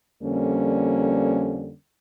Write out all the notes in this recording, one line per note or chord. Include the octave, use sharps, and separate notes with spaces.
F2 D3 G3 A#3 C#4